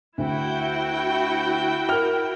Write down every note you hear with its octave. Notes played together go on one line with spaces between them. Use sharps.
D2 E4 F#4 G5
A#4 F6